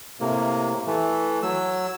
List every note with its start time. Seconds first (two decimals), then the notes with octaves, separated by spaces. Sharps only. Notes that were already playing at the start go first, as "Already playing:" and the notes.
0.20 A2 C3 A#3
0.87 E3 A3
1.43 F#3 E6